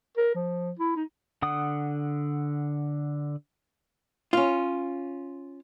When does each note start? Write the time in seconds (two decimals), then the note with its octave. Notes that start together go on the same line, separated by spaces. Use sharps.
0.17 A#4
0.35 F3
0.79 E4
0.96 D#4
1.42 D3 F#5 D#6
4.33 C#4 F4